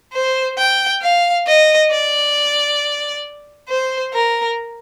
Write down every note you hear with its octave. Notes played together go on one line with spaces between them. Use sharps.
C5
G5
F5
D#5
D5
C5
A#4